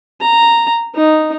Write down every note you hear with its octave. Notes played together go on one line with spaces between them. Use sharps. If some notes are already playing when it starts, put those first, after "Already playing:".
A#5
D#4